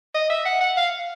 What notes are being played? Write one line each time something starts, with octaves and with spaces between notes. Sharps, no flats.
D#5
E5
F#5
F#5
F5